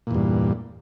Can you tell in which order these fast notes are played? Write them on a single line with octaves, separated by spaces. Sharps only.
A#2 E2 G2